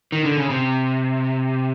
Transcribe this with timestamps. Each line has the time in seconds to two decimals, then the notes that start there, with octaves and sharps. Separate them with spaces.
0.12 D#3
0.25 D3
0.37 C#3
0.50 C3